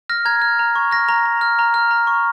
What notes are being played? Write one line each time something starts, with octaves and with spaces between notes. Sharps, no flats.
F6 A#6
A#5 G#6
F6
A#5
C#6
F6 A#6
A#5
A#5
F6
A#5
F6
A#5
C#6